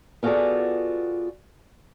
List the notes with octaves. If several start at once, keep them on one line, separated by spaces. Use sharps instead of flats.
B3 F4 F#4 G#4 A4 D5